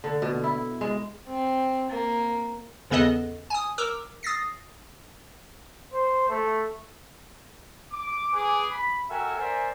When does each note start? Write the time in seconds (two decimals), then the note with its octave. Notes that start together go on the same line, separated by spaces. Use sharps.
0.04 D3
0.22 B2
0.44 E4
0.81 G#3
1.28 C4
1.90 A#3
2.90 E2 C#3 B3 A4 D#5
3.50 G#5 D#6
3.78 A#4 D6 E6
4.23 D#6 A6 A#6 C7
5.93 C5
6.29 A3
7.92 D6
8.33 G#4 B4 G#5 D6
8.71 B5
9.09 F#4 A4 A#4 E5 G5 G#5
9.38 A#4 C5 D5 E5 G#5